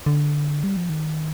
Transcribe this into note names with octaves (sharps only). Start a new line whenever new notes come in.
D3
G3
F3
D#3